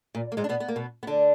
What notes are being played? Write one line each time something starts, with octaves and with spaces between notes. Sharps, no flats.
A#2
A#3
G#2 G#3
D4
B2 B3
B3
A#3
B2 B3
B3
D3 D4